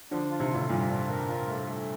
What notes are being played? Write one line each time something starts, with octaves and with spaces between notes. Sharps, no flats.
D3 F3 D4
F4
C3 D#3
A2 C3 F4
G2 A#2 F4
D4
A#4
F4
A3
A3